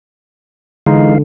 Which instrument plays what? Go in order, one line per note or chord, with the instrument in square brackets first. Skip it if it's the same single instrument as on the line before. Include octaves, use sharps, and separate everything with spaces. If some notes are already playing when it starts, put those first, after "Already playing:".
[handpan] D3 [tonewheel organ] E3 F5 [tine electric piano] G#3 D#4